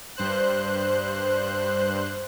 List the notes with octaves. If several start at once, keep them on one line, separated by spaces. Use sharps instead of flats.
G2 C5 F#6